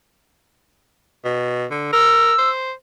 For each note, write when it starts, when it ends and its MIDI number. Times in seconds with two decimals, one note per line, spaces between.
1.24 1.65 47
1.70 1.92 50
1.92 2.33 70
1.92 2.49 88
2.38 2.72 72